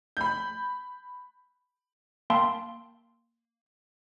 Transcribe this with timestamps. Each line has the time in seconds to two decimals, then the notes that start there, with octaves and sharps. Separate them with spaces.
0.17 B5 G6
2.30 A#3 F5 G5 A5 B5 C6